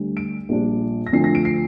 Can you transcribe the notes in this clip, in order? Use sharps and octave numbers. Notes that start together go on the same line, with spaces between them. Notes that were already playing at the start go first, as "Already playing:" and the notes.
Already playing: D2 D3 G3
D7
A#1 A#2 G3 D4
A#6
D2 D3 F3 C7
A#6
D7
C7